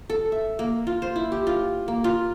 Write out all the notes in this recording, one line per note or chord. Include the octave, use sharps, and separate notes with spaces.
A4
E5
A#3
F4
C5
E4
G4
F4
A#3
F4